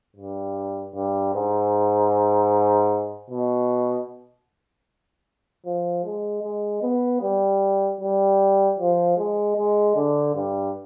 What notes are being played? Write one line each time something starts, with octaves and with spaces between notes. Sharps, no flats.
G2
G2
G#2
B2
F3
G#3
G#3
B3
G3
G3
F3
G#3
G#3
D3
G2